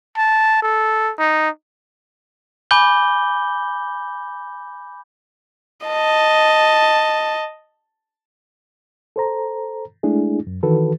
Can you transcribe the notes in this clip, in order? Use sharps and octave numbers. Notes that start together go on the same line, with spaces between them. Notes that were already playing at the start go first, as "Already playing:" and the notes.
A5
A4
D#4
G#5 B5 D6 G6 G7
D#5 A5
A4 C5 A#5
G#3 A3 D4 E4 G#4
F#2
D#3 E3 F#4 A4 B4